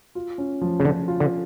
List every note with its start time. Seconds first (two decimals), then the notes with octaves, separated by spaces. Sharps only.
0.15 F4
0.38 C#4
0.61 F3
0.80 C#3
0.84 D3 F3
1.08 F4
1.20 D3